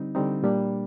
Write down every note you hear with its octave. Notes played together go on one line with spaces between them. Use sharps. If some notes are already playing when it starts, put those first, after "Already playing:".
Already playing: D3 G3 C4 D#4
D3 G3 C4 D#4
A#2 G3 A#3 D4